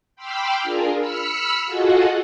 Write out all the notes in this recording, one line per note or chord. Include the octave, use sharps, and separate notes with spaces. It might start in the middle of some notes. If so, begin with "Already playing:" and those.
G5 B5 C6 D6 E6 F6
D4 F4 G#4 A#4
B5 E6 F6 B6 C#7
F4 F#4 G#4 A4 D#5 F#5